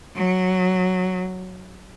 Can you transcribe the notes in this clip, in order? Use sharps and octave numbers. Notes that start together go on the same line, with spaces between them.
F#3